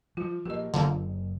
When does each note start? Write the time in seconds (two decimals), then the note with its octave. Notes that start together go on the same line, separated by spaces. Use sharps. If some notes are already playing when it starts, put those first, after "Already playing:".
0.17 F3 G3 F4
0.46 F3 G#3 A#3 G4 D#5
0.74 F#1 D3 F3 A#3